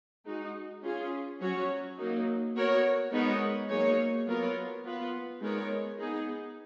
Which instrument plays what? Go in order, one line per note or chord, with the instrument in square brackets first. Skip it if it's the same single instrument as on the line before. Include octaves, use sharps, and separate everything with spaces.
[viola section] G#3 D#4 F#4
C#4 F4 G#4
F#3 C#4 F#4 C#5
F#3 A#3 D#4
B3 F#4 A#4 C#5
G#3 B3 D#4 A#4 C#5
F#3 A#3 D#4 G#4 C#5
F#3 B3 F4 A#4 C#5
B3 F4 B4
G#3 B3 D#4 A#4 C#5
B3 D#4 G#4